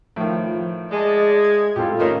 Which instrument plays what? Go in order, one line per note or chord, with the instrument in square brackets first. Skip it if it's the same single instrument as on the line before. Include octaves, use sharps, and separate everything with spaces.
[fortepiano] A2 D#3 [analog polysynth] F3
[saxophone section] G#3 [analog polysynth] D5 D#5 A5
[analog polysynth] G#6
[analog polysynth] A2 F4 A4 [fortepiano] G3 C4 G4
[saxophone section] D#3 [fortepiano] A3 A#3 C#4